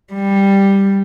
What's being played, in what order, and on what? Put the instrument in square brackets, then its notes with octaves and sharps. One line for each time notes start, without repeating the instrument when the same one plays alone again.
[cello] G3